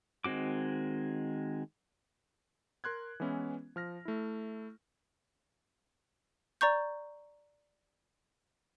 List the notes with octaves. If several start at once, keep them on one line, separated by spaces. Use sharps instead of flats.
D#3 G#3 C4 F#4 D6
A#4 C6 F#6 G#6
E3 G#3 B3 C#4 E4
F3 F6 A#6
A3 E4
D5 A#5 C#6 G6